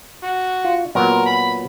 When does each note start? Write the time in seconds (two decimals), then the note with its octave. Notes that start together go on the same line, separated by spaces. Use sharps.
0.23 F#4
0.64 F4
0.95 A#2 F#3 B3 A#4
1.26 B5